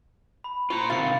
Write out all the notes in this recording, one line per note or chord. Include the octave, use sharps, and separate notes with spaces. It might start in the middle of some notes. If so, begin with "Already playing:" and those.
B5
F4 C5 A#5 C#6
C3 D#3 F5 A6 C#7